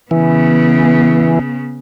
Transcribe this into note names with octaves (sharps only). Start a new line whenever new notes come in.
C#3 E3 B3